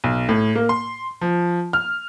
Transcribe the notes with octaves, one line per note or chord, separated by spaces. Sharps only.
B1
A2
A#3
C6
F3
F6